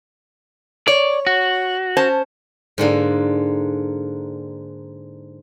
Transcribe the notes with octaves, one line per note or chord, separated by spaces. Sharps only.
C#5 D5
F#4
C#4 C5 A5
G#2 D3 A#3 D4